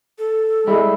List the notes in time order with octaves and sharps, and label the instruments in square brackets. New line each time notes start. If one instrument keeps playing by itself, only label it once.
[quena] A4
[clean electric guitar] G3 E4 [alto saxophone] G#3